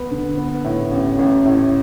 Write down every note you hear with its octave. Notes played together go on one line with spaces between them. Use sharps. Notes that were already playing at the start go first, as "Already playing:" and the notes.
Already playing: B3 B4
D3
B3
A2
A1
A1
A2